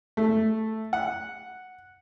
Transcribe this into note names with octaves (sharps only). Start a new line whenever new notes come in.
A3
F#5